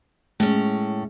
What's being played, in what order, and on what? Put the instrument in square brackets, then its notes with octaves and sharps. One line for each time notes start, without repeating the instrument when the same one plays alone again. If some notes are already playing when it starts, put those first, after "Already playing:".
[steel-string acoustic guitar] A2 C#4 [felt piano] G#3